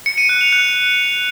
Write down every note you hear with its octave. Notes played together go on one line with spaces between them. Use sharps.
C#7
D#7
F#6
F7
F#6